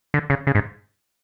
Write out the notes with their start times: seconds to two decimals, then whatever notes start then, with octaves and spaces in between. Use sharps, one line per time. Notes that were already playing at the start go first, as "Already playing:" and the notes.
0.14 D3
0.30 C#3
0.47 C#3
0.55 G#2